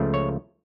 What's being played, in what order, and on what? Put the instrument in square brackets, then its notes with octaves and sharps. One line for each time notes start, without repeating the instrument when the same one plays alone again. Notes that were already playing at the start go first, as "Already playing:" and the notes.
Already playing: [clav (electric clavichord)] C#2 C#3 F3 A3
C#5